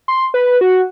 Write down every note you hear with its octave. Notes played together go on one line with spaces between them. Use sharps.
C6
B4
F#4